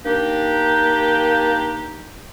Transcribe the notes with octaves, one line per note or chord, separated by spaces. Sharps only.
A#3 D4 D#4 G4